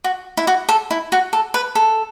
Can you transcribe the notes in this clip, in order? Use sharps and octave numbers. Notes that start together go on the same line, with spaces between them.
F#4
E4
F#4
A4
E4
F#4
A4
B4
A4